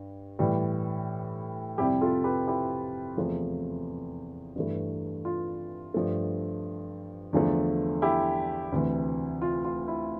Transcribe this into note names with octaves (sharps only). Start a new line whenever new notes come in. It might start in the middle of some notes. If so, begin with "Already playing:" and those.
Already playing: G2
A2 E3 G3
F2 C3 G3 E4 G4
F4 A4
G4 B4
E4 G4
E2 C3 F3 A3
G2 E3 A3
F4
G2 F3 A3
E2 D3 F3 A3
E4 G4
D2 C3 E3
F4
F4
E4